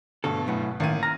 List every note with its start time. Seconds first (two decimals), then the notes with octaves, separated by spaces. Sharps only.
0.24 D2 G2 B2 A4
0.47 F#2 A2 B3
0.80 A1 D#3 A#3 D#7
1.03 A#5 F6